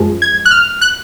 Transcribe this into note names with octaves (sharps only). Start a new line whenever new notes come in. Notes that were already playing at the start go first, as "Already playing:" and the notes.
Already playing: F#2 F3 G#3
G#6
F#6
F6
F#6